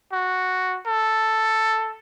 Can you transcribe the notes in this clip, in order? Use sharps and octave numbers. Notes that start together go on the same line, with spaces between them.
F#4
A4